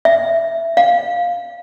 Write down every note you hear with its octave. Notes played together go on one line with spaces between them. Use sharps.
E5
F5